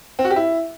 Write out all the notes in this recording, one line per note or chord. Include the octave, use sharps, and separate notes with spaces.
C4
F#4
G4
E4